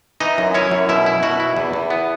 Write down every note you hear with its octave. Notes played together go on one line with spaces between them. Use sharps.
E3 D#4 D#5
F#2
C#4 E4 C#5
F#2
B2 E4 E5
E4
B2 F#4 F#5
E4
E2
E2
B3